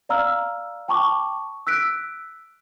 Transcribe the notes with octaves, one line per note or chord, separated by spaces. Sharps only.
D5 F5 A#5 E6 F6
G5 A5 B5 C#6 D6
E6 F#6 B6 D7